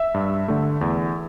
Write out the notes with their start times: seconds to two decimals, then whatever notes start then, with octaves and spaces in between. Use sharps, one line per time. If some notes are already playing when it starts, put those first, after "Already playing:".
Already playing: E5
0.14 G2
0.48 D3 A3
0.81 E2